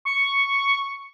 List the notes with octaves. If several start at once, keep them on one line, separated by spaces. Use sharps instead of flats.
C#6